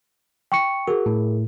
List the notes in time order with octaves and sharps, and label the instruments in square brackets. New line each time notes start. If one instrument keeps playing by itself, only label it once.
[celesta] G5 C#6 C#7
[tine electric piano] F#4 [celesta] G#4 A#4
[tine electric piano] A2